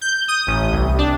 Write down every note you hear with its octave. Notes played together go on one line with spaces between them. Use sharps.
G6
D#6
A1
C2
D4